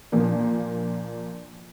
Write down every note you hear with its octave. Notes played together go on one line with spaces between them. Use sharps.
A#2 F3 A#3 D4